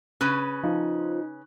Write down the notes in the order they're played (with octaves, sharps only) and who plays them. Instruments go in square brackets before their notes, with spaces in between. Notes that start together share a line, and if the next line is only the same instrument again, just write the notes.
[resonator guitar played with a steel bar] C#3 C#4 B4 [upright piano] F#6
[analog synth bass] F3 [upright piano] D#4